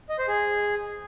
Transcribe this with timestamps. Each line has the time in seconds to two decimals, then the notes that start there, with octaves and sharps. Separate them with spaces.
0.09 D#5
0.19 C5
0.28 G#4